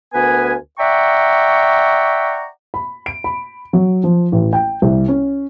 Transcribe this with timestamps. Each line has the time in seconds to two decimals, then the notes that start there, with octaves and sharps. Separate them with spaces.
0.14 D2 B3 A#4 B4 G#5
0.79 D5 E5 F#5 G5 A#5 C#6
2.74 B5
3.06 D7
3.24 B5
3.73 F#3
4.04 F3
4.32 A1
4.53 G5
4.82 C2
5.08 C#4